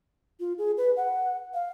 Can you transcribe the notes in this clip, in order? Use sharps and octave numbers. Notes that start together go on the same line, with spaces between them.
F4
G#4
B4
F#5
F5